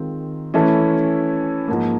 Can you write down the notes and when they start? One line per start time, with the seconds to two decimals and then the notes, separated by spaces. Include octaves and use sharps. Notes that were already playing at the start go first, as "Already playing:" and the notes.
Already playing: D#3 G#3 C4 F4
0.54 E3 A3 C#4 E4 A4
1.68 G#2 F3 A#3